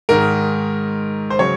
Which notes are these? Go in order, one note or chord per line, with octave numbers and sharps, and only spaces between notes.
G#2 D#3 G#3 A#4
C5
C#3 F#3 C#5